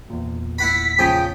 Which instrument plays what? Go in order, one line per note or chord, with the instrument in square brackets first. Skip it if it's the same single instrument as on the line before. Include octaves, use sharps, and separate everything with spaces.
[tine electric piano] E2 A#2
[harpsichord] E4 F#5 B5 [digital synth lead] B6
[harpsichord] C#3 F3 G#5 [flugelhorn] G5